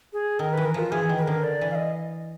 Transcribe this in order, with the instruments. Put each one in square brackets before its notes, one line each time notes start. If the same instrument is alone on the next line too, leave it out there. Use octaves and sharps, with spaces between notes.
[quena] G#4
[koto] D#3 [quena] A#4
[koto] E3 [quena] B4
[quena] A#4
[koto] F3 [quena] F4
[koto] E3 [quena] G#4
[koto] D#3
[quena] B4
A#4
[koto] D3
[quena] D5
[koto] E3
[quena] F5
D#5